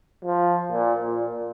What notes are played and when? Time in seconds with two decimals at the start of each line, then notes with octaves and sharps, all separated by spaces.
0.25 F3
0.71 A#2
1.03 A#2